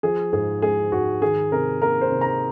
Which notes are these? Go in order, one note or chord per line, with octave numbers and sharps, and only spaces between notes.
F3 G#4
G#2 G#4
G#3 G#4
G#2 F#4
D#3 G#4
C3 A#4
A#3 A#4
C5
C3
A#5